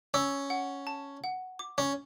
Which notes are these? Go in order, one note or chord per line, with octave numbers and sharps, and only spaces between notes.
C#4 E6
F#5
A5
F#5
D6
C#4